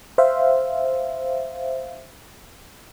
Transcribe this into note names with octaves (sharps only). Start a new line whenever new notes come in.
C5 E5 F5